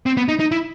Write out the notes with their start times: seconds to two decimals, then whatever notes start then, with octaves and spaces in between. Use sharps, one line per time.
0.06 C4
0.17 B3
0.28 D#4
0.40 D#4
0.51 E4